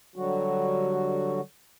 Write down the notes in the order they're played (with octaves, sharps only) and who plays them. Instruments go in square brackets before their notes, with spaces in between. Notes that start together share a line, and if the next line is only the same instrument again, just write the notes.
[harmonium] D3 F#3 G3 F#4